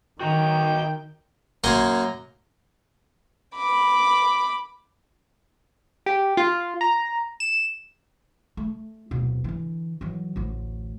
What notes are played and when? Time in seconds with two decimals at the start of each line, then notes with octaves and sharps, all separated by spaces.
0.21 D#3 F#4 D#5 G5 A#5
1.64 F#2 A#3 G#5 A#5 C6 C#6
3.56 B5 D6
6.06 G4
6.37 F4
6.81 A#5
7.40 E7
8.57 A3
9.11 D1 B2
9.44 D3 E3
10.01 E3 F#3
10.36 A1 D2